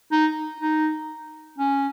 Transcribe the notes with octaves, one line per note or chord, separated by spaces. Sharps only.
D#4
D#4
C#4